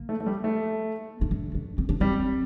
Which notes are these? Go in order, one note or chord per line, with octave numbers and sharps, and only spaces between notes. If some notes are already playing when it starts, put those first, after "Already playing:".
Already playing: A#3
A3
A3
G3
A3
D#4
D4
D4
C4
D4
G3 C4